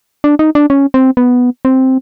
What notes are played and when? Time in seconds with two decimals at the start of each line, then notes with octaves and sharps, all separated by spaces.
0.24 D4
0.39 D#4
0.55 D4
0.70 C#4
0.94 C4
1.17 B3
1.65 C4